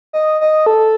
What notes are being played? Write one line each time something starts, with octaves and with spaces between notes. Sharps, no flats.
D#5
D#5
A4